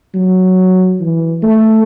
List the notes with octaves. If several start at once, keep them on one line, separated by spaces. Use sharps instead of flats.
F#3
E3
A3